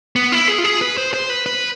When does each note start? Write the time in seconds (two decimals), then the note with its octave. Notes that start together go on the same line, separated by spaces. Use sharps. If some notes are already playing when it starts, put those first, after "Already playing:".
0.16 B3
0.32 E4
0.48 G#4
0.58 F4
0.64 G#4
0.81 B4
0.97 C5
1.14 C5
1.30 B4
1.46 B4